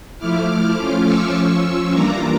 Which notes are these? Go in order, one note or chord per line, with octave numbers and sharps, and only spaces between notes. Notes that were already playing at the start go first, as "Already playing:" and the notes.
F3 A3 E4 D6 F6
D6 F6
F3 A3 C#4 F4
C#6 E6
F3 C#4 F4
E3 G3 A#3 D4 F4 A#5 D6